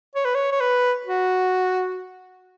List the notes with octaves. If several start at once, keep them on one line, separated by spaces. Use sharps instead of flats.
C#5
B4
C#5
C#5
B4
F#4